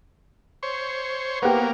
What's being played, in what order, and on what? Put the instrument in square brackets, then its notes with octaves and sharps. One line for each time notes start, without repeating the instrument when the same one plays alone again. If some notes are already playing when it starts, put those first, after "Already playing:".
[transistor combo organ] C5 C#5
[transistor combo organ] A#3 [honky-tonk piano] B3 G4